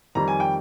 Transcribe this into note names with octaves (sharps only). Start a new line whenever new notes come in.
F2 D#3 G3 A#5
G#5
G5